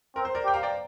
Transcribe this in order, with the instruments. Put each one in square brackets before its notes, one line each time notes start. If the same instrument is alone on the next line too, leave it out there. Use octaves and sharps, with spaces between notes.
[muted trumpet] C4 [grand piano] A#4
[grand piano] C5
A#4 D5
[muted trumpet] G4 [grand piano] G5
[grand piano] F5 A#5
D5 G5